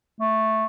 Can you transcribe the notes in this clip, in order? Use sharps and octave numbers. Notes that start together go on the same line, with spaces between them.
A3